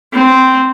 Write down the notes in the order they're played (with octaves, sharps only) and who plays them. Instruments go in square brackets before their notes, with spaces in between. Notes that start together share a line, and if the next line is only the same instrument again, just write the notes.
[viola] C4